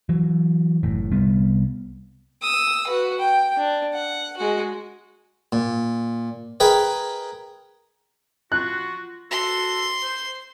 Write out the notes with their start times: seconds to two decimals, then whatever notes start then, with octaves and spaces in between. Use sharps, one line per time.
0.09 E3 F#3
0.83 F#1 A2
1.11 C2 G3 B3
2.42 D#6 E6
2.87 F#4 B4
3.19 G5
3.57 D4
3.94 F#5
4.37 G#3 F#4
5.52 A#2
6.60 G#4 A#4 B4 D#5 G5
8.52 F4 F#4 F#6
9.31 F#4 A4 C6
10.02 C5